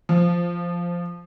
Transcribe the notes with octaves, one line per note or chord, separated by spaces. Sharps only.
F3